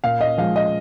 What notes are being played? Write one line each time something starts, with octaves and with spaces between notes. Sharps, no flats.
A#2 F5
D#5
F3 G#3 F5
D#5